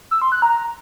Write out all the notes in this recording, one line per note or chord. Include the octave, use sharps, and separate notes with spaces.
E6
C6
F#6
A#5